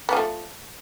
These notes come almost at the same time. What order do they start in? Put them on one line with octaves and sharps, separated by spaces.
B3 F3 A3